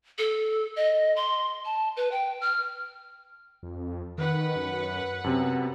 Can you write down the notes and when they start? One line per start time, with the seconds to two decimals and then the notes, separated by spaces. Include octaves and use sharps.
0.19 A4
0.76 D#5
1.16 C6
1.65 A5
1.97 B4
2.11 G5
2.41 F6
3.63 F2
4.18 D#3 B4 F#5
4.56 F#2
5.24 F#2 C3 B3